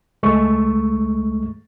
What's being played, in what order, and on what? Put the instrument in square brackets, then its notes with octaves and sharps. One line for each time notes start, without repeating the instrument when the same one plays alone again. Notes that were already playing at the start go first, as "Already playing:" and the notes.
[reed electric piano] C#2 G#3 A3 C#6